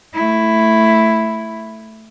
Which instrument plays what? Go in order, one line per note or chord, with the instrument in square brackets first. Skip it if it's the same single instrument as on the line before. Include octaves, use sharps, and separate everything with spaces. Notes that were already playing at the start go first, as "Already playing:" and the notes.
[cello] A3 E4